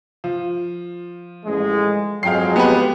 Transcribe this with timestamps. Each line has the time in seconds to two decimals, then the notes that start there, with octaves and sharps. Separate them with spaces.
0.24 F3
1.46 A1 G#3
2.23 F2 F#3 G#3 F5 G5 C7
2.56 B3 G4 B4